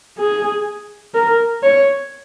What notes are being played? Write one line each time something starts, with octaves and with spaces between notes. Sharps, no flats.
G#4
A#4
C#5